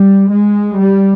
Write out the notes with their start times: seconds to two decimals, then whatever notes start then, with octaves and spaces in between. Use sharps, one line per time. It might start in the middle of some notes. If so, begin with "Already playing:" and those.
Already playing: G3
0.32 G#3
0.78 G3